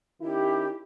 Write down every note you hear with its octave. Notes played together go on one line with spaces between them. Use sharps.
D#3 C#4 E4 G4